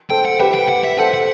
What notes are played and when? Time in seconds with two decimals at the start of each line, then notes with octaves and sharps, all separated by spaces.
0.10 A4 C5 G5
0.25 F#5
0.40 G4 B4 E5
0.55 G5
0.69 F#5
0.84 E5
0.98 A4 C5 F#5
1.14 F#5